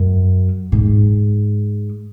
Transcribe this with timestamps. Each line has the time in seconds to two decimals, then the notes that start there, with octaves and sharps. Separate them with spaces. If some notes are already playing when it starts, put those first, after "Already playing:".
Already playing: F#2
0.72 G#2